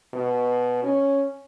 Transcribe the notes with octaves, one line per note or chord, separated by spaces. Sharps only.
B2
C#4